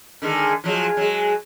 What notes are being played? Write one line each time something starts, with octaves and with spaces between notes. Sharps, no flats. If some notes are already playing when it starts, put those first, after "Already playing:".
D3 D#3 G#3
F3 F#3 G#3
F#3 G#3